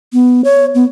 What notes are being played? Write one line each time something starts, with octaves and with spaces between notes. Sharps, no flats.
B3
C#5
B3